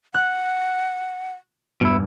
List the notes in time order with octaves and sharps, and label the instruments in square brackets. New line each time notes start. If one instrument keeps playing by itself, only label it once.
[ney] F#5 [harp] F#6
[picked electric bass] E1 G2 [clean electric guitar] B2 E4